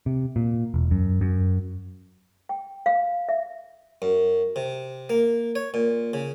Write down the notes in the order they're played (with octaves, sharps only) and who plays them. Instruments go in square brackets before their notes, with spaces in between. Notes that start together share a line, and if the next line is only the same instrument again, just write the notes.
[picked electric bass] C3
A#2
E1
F#2
F#2
[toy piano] G5
F5
E5
[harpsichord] F#2
C3
A#3
C#5
A#2
C#3